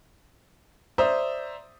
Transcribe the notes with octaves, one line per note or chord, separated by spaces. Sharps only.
C5 D5 E5 A#5 D#6